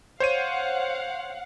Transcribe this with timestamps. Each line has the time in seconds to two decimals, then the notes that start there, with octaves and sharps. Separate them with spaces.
0.20 C5 C#5 F5 F#5 D#7